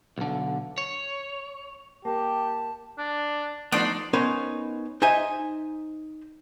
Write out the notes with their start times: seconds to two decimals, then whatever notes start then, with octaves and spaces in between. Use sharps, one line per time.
0.18 B1 D3
0.78 C#5
2.05 A#3 G4 A5
2.98 D4
3.72 F3 A3 B3 D4 D#4 D5 C6
4.13 B3 C#4 D#4 A#4 C5
5.02 D#4 C5 D#5 E5 G#5